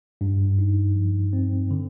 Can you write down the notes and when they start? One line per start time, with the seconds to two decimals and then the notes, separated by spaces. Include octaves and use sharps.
0.21 G2
0.59 D#4
0.95 F3
1.33 C4
1.71 D3